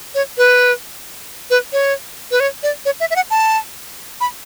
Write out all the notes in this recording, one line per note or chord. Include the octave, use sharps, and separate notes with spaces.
C#5
B4
B4
C#5
B4
C#5
D5
C#5
E5
E5
F#5
A5
B5